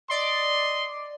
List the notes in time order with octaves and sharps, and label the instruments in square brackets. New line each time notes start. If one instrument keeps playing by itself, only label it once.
[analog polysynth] D5 [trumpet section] D#5 C6